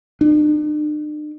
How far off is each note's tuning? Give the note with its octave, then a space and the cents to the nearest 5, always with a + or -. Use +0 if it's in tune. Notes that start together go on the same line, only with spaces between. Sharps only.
D4 +45